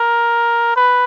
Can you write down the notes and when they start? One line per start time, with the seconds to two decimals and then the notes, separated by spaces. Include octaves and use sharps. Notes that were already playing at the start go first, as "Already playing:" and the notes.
Already playing: A#4
0.76 B4